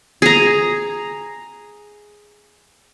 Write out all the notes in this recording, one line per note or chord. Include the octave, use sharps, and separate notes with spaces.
G#4 A#5